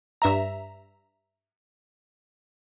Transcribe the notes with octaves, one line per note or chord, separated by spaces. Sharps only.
G2 E5 A#5